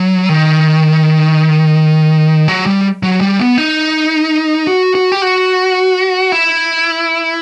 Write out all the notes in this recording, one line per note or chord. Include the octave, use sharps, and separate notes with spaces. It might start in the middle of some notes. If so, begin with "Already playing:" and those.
Already playing: F#3
D#3
F#3
G3
F#3
G3
B3
D#4
F#4
F#4
G4
F#4
E4